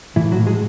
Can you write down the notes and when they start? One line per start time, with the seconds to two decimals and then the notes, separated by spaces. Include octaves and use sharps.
0.16 A2 E3 E4
0.32 F#3 F#4
0.39 A2
0.47 G#3 G#4